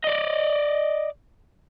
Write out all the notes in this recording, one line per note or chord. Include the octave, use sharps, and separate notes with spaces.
D5 D#5